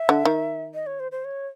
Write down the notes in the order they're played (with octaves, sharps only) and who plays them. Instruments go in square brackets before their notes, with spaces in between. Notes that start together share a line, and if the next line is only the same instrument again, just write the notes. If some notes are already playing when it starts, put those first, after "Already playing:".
Already playing: [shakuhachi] E5
[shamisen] D3
D#3
[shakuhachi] D#5
C#5
C5
C5
C#5